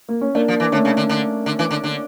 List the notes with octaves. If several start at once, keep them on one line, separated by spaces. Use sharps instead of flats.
A#3
C#4
A3 A#3 D4
F3
E3
D3 A3 C#4
C#3
D3
D3
D3
E3
D3
D3